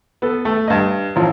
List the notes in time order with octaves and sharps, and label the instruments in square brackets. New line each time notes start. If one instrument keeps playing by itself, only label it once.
[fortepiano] B3 A4
A3
G2 D#5
A1 F3